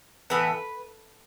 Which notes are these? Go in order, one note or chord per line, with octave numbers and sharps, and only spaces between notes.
A2 E3 B3 B4